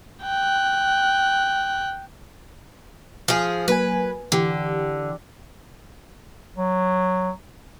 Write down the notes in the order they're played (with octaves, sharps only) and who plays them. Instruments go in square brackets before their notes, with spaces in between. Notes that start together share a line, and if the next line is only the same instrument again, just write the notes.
[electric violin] G5 F#6
[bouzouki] F3 G#4
[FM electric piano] F#3 A#3 G#5 [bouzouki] B4
[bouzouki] D3 [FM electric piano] E3 G4
[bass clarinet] F#3